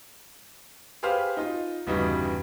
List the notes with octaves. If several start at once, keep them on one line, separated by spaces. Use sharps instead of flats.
G4 G#4 B4 C5 F5 F6
D#4 F4
G1 E2 C#3 G3 D#4 F#4